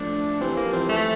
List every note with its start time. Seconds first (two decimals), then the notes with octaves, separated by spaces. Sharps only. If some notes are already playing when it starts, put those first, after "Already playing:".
Already playing: F3 A3 D4
0.40 E3 G3 C4
0.52 E3 A#3
0.65 F3
0.73 E3 G3 C4
0.89 E3 G3 A3